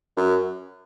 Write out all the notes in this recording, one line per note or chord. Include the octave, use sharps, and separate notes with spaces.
F#2